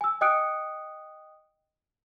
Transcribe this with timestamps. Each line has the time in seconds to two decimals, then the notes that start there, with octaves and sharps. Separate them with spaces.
0.01 G#5 E6
0.21 D#5 G5 D#6 F#6 C#7 D7